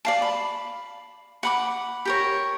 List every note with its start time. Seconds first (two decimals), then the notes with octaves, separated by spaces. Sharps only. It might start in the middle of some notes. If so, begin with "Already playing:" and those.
0.05 D5 F5 A5
0.22 B5
1.43 F#5 B5 D6
2.05 G4 A#4 C#5